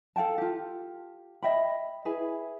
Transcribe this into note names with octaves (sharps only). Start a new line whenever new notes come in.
A4 F5 G5 A5
F4 G4
D#5 E5 G5 B5
E4 G#4 B4 G#5